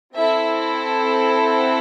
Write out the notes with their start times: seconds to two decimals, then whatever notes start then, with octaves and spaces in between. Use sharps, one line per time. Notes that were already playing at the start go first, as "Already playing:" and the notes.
0.15 C4 E4 A4 E5
1.48 F#5